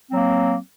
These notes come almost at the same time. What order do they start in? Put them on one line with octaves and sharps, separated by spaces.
C4 F#3 A#3